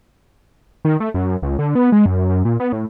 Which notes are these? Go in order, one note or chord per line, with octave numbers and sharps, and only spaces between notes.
D#3
A3
F#2
C#2
D3
B3
G#3
F#2
F#2
A#2
B3
A2